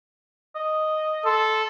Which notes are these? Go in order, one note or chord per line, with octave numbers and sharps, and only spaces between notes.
D#5
A4 C6